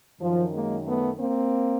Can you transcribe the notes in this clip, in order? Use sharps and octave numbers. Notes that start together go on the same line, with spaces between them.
F#2 D#3 F3
G#3 A#3
A3 B3
A#3 C4